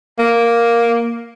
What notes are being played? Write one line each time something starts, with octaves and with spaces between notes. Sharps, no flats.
A#3